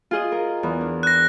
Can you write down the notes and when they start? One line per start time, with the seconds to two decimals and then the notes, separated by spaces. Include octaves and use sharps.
0.11 F4 G#4 D#5
0.32 A#4
0.63 E2
0.81 D4
1.03 F#6 A#6